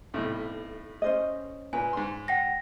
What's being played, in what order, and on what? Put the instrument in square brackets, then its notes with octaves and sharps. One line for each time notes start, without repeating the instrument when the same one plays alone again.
[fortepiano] B1 A2 C3
[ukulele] C#4 C5 D#5
[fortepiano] A#2 B4 [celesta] G#5
[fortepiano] G#2 C6
[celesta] F#5 G5 A#6